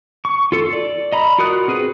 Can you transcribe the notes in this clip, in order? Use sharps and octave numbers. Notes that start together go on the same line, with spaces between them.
C#6
F4 A4
D5
D#5 A#5 B5
F4 F#4 A#4 D#6 F#6
C4 G#4 B4